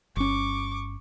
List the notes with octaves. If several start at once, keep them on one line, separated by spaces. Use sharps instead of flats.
G1 C#4 C#6 D6